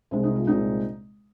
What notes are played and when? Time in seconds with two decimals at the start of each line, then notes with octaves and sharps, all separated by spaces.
0.11 C2 C3 G#3 C5
0.23 D#4
0.36 F4
0.47 C2 A#2 G#3 C4 D#4